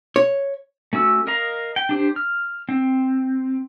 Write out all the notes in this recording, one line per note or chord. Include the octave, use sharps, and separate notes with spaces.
C#5
A3 C#4 F#4 E6
A#4 D#5 F5 A#5
G5
D4 G4 C5
F6
C4